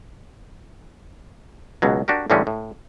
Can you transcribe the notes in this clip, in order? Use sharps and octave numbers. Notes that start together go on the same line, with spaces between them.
C#2 B2 F#3
D4 F#4 G4 A#4
A2 D3 E3 G3 G#3 C#4
A2